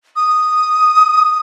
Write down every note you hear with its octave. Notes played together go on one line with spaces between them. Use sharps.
D#6